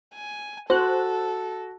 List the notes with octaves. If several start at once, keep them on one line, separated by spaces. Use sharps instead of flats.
G#5
F#4 A4 C5 F#6